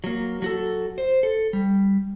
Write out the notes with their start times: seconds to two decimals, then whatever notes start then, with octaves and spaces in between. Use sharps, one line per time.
0.04 F#3 A#3
0.42 F#3 F#4 A4
0.98 C5
1.23 A4
1.53 G3